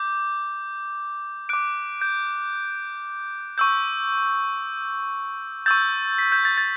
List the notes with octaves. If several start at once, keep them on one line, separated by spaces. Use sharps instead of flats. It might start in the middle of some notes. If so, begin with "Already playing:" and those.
Already playing: D6 G6
D6 F#6 D7
G6
C#6 E6 G6
C#6 E6 G6 A6
B6
G6
A6
A6